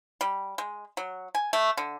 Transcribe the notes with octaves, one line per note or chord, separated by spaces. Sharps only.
G3
G#3
F#3
G#5
A3
D3